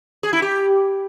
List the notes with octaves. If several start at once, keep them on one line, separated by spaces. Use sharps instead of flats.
G#4
E4
G4